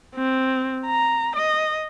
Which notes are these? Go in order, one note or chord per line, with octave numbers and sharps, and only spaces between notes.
C4
A#5
D#5